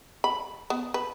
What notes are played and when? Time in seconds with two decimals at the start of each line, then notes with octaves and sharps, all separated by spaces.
0.24 B5
0.70 B3
0.94 B4